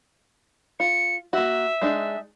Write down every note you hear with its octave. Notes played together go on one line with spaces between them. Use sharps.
F4 C#7
A#3 F#4 E5
G#3 D4 D#4